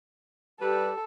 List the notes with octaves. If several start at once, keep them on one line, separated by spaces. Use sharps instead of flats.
G3 G4 A4 B4 D5